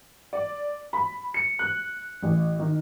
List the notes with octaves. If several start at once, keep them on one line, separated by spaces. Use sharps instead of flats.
D5
B5
C#7
F#6
A1
D#3